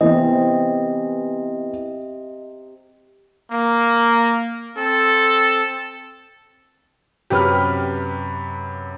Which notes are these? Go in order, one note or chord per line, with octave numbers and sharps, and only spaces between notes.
C3 E3 B3 D#5
A#3
C4 A4
F#2 C3 F#3 G4 B4 F6